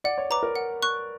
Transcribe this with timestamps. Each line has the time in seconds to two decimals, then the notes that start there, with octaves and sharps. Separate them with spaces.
0.04 D5 F#5
0.18 C#5
0.30 B4 A#5 D6
0.43 A#4
0.56 F#5
0.82 C#6 F#6